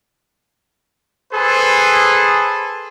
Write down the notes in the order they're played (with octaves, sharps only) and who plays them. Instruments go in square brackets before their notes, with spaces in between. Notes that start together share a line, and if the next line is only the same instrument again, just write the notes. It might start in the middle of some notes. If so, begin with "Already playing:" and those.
[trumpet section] G#4 A4 B4 C5